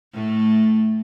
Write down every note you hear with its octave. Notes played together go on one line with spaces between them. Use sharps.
A2 A3